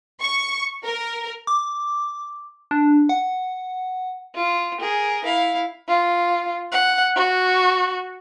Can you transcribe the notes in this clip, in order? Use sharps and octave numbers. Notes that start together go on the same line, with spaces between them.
C#6
A#4
D6
D4
F#5
F4
G#4 A#4
E4 F5
F4
F#5
F#4